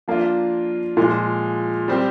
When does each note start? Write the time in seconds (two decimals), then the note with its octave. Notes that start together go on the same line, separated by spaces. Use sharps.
0.08 F3 A#3 D4 F4
0.97 A#2 F3 G#3
1.88 G3 C4 G4